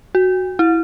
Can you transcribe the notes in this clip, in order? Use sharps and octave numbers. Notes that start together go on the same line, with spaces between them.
F#4
E4